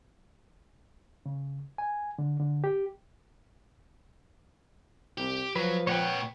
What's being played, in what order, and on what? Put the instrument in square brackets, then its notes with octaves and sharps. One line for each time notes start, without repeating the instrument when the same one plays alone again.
[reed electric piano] C#3
G#5
D3
D3
G4
[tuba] C2 [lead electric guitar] G4
[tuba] F3 [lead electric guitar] F#3 [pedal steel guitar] B4
[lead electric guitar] A#2 B4 [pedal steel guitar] C#5 F#5 G5